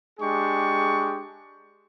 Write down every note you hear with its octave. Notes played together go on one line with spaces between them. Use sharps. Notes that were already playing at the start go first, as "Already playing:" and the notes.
G#3 D4 G4 G#4 C#6